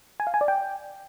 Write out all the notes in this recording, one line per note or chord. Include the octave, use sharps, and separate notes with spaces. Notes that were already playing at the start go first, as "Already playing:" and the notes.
G#5
F5
G#5
D5
G5